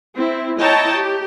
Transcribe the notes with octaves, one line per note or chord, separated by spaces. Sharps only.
C4 E4
E4 C#5 D#5 G5 A5 A#5
G4